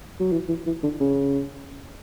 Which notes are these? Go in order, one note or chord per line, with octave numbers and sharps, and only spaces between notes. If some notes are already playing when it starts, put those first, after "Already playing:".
F#3
E3
E3
E3
D3
C#3